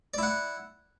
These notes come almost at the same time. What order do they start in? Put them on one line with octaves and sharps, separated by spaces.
D5 E4 F#5